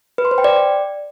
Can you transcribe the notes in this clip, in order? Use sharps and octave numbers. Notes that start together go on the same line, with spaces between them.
B4
C6
C5
G5
D5